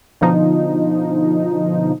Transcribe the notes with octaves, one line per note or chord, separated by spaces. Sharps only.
B2 D3 F3 D#4